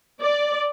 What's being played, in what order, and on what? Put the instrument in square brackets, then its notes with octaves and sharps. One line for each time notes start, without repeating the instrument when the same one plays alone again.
[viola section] D5